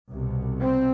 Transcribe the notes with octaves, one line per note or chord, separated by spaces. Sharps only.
C2 B2
C4